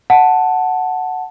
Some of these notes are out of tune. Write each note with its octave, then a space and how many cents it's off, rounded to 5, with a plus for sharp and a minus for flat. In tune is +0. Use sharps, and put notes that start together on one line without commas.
F#5 +0 A5 +0